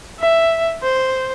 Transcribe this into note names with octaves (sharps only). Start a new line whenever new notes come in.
E5
C5